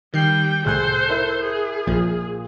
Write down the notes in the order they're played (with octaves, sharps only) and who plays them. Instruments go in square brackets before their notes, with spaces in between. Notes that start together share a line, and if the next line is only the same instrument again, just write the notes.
[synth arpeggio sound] D#3 C7 [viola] G3 G5
[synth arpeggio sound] C2 A2 G#5 [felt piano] G#4 F#6 [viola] A4 C5
[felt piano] E4 A#4 E5
[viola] G#4
[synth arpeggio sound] A#1 F3 [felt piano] A#2